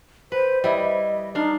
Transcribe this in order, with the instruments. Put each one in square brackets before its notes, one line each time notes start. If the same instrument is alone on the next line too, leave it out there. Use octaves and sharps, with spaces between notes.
[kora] B4 [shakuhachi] C5
[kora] G3 E4 [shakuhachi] D#5
[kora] D4 F5 [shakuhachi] D#4